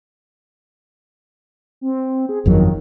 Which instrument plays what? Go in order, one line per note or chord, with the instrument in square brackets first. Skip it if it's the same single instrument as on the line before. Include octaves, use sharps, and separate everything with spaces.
[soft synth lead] C4
G#4
[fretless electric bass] G1 F2 F#3 [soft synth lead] D#3